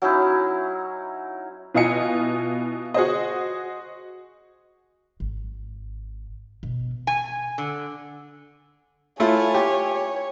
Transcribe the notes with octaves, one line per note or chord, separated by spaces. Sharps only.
F#3 C#4 D#4 E4
B2 E4 F4 D#5 G#5 C#7
F#4 G#4 C5 D#5
G#1
B2
G#5
D3
A3 E4 F4 C#5 G#5
G4
C#5